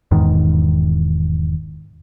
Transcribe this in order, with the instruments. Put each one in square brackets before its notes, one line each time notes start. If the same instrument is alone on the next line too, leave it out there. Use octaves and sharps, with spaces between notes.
[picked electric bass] E1 E2 G#2 D#3